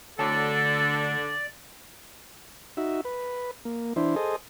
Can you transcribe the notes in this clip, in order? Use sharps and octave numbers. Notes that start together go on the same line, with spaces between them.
D2 D3 A4 C#5 D5 A5
D#4 F#4 E5
B4
A#3
E3 D4 E4 C5
G#4 A4 C5 D#5